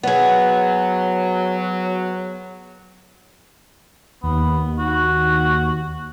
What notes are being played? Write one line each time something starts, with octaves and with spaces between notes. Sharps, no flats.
F#3 B3 G#4
D#2 B3
F#4